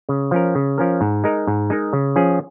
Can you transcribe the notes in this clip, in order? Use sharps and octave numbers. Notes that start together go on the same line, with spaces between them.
C#3
F3 C#4 A#4
C#3
F3 C#4 A#4
G#2
G#3 D#4 A#4
G#2
G#3 D#4 A#4
C#3
F3 C#4 G#4